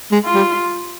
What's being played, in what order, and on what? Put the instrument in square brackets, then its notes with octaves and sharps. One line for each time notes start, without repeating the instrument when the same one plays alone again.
[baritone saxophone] G#3
[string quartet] F4
[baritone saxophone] G3